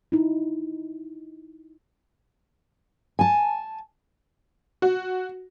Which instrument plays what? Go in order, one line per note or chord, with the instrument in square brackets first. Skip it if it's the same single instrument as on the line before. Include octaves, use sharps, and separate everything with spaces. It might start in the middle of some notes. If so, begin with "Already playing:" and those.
[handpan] D#4 E4
[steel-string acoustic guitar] G#5 A5
[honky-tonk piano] F#4